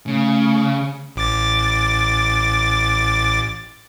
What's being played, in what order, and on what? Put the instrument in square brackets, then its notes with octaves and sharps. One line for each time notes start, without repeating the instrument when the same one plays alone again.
[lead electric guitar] C#3 [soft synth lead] A3
[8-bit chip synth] A1 D6 A6